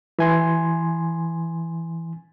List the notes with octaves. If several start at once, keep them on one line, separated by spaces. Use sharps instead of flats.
E3 G#5 C6